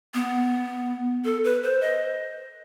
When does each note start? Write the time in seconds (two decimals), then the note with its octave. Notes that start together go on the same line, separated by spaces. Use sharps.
0.14 B3
1.25 A4
1.44 B4
1.63 C5
1.81 D#5